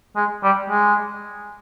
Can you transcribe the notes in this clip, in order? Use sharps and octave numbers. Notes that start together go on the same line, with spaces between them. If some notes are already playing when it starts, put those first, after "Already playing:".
G#3
G3
G#3